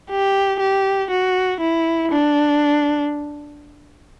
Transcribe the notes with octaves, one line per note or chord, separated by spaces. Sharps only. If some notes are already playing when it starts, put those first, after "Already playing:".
G4
G4
F#4
E4
D4